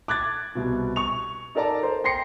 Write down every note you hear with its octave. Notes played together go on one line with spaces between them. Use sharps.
D6 F#6 G#6 A6
C2 B2
C#6 F7
D#4 A4 A#4 D5 A5 A#5
C5
G5 C6 A#6 C7 C#7